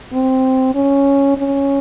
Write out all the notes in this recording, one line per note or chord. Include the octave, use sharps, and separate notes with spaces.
C4
C#4
C#4